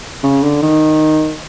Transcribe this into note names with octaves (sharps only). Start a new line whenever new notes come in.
C#3
D3
D#3